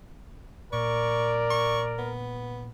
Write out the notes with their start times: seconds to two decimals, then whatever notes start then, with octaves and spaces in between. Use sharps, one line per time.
0.73 A#2 A#4 D5 C#6
1.50 C#6
1.98 B3